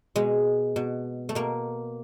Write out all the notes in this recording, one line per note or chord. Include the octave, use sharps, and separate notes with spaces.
B2 G#3
B2
A3
B2 A#3